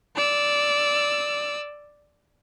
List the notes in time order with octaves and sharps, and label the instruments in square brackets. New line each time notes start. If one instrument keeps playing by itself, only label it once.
[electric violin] D5 E6